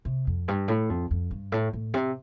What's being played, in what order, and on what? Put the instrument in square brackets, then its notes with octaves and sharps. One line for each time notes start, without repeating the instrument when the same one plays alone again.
[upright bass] C3
F2
G2
A2
F2
F2
G2
A2
A2
C3